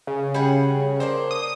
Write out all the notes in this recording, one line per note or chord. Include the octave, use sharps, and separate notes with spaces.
C#3
G3 G#4 F#5
A#3 D4 C5
D#6